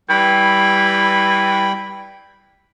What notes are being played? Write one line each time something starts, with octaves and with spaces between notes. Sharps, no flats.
E3 G3 G5 B5